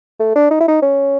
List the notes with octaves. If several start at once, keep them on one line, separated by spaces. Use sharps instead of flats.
A3
D4
D#4
E4
D#4
C#4